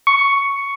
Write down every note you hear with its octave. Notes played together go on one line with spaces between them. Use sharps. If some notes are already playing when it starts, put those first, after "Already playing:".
C#6